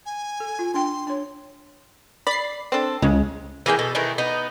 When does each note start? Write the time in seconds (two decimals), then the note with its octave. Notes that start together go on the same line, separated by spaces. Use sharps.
0.06 G#5
0.40 A4
0.59 F4
0.74 D4 G5 C6
1.07 D4 C#5
2.27 D5 B5 C7
2.72 C4 D4 A4
3.02 C#2 C#3 G#3
3.66 E3 A#3 G#4 G5
3.79 B2 A4
3.95 D#3 E3 A3 D#4
4.18 B3 D#4